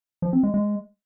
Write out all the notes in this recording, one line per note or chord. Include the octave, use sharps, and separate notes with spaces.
F3
C4
G#3
G#3